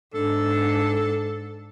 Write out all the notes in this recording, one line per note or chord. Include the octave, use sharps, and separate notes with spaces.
G#2 D4 A4